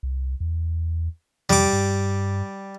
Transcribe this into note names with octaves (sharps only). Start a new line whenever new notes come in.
C2
E2
F2 G3 D6
G2